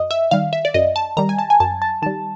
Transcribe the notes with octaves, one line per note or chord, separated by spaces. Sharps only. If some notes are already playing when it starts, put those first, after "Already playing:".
Already playing: F#2 D#5
E5
D#3 G3 F5
E5
D5
F#2 D#5
A5
D#3 G3 A#5
G#5
A5
G#5
F#2 A5
A5
D#3 G3 A5